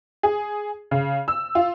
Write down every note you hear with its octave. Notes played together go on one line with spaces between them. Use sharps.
G#4
C#3
E6
F4